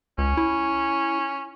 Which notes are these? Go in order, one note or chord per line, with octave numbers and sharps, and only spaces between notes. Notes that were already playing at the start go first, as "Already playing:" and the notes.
C#2 C#4
E4